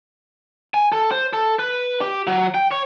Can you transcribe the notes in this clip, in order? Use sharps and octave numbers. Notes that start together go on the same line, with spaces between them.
G#5
A4
C5
A4
B4
G4
F#3
G5
C#5